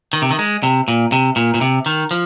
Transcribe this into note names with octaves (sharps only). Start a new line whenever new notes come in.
D#3
C3
D#3
G#3
C3
A#2
C3
A#2
A#2
C3
D#3
F3